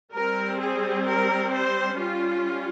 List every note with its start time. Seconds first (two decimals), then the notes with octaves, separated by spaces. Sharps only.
0.14 G3 C4 A#4
0.61 G#4
1.08 A#4
1.54 C5
2.00 G3 C#4 F4